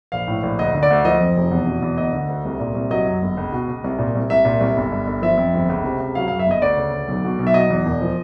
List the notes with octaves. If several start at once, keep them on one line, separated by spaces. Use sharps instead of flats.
A#1 F5
A2
A#1
D2 D#5
D3
D5
D2
F3 D#5
F2
F1
E2
B2
E2
D2 D#5
D3
D2
C2
A#2
C2
F#3 D#5
F#2
G1
C#2
B2
C#2
C2
A#2
C2
C2 E5
A#2
C2
G1
G2
G1
F3 E5
F2
G1
C#2
C3
C#2
F#3 F5
F#2 F5
E5
G1 D#5
D2 D5
C#3
D2
B1
B2
B1
E5
F#3 D#5
E2
E1
F3